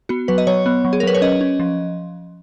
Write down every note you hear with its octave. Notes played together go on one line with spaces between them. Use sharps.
B3 F#4
F#3 B4
D#5
F#3 C#5
B3
F#3
G#4
A#4
F#3 B4
C#5
C#4 D#5
C#4
F3